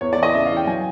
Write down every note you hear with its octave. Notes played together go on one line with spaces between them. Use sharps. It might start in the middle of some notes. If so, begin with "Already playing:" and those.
E2 C#5
E3 D5
D#5
C#3 E5
F5
E3
G5
F#3 G#5